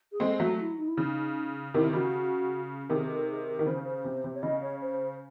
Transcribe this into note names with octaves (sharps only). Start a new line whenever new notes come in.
G#4
G#3 C4 A4
F#3 A3 F#4
E4
D#4
E4
C#3 D#4
C3 D#3 E4
C#3 F#4
C3 D#3 G#4
A4
G#4
D#3
C#3 C5
C5
C3
C3
C#5
C#3 D#5
C#5
C5